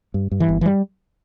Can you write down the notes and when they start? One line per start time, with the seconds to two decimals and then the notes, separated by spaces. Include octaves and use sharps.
0.14 G2
0.31 G2
0.40 E3
0.49 G1
0.61 E3
0.66 G3